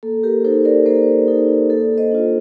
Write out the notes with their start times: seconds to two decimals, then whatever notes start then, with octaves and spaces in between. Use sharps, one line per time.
0.03 A#3 A4
0.23 G4 A#4
0.45 D#4 A4 C5
0.65 A#4 D5
0.86 A#3 A4 C5
1.28 D#4 A4
1.70 A#3 A4
1.98 C5 D#5
2.11 D4 F4